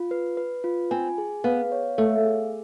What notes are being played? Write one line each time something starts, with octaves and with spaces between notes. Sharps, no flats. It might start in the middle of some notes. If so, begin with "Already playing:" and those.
Already playing: F4
B4
B4
F4
C4 G#5
G#4
B3 F5
C#5
A3 F5
G#4